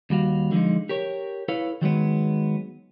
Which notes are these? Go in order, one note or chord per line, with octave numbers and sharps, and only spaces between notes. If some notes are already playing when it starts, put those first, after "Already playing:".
D#2 G3 F#4 F5
D3 F3 F#3 G#3 D#4
G4 A#4 C#5
E4 A4 B4 C#5 F5
D#3 F#3 G#3 B3